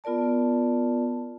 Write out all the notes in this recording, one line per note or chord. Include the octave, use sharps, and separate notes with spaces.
B3 F4 A#4 D5 A5